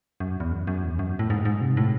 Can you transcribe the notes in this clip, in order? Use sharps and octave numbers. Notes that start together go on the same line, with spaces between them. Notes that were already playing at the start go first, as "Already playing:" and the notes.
F#2
E2
F#2
F#2
E2
F#2
A2
G#2
G#2
C3
A2